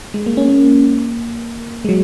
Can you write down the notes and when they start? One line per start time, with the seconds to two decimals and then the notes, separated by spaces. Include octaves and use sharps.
0.14 G#3
0.26 A#3
0.37 C#4
0.49 A#3
1.85 G#3
1.89 F#3